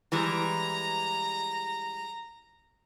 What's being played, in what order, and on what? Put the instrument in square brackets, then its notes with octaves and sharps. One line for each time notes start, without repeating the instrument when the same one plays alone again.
[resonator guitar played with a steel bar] E3 G3 G#3 [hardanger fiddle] A#5